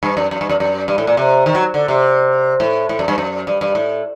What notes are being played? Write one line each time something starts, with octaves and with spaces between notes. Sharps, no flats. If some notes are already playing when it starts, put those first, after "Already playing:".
G2
F#2
F#2
G2
F#2
F#2
G2
A2
A#2
C3
D#3
F#3
D3
C3
A2
A2
F#2
G2
F#2
G2
G2
A2